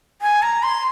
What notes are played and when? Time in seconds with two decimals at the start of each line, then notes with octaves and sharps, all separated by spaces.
0.22 G#5
0.42 A#5
0.63 C6